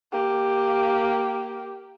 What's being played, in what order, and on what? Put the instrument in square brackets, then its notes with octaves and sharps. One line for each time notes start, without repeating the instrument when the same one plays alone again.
[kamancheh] A#3 G4